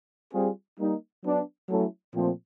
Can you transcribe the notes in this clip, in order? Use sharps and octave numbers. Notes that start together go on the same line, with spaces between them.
G3 C4 F4 G#4
G3 A#3 D#4
F#3 B3 D4
F#3 A3 C#4 E4 A4
A#2 F3 A3 C4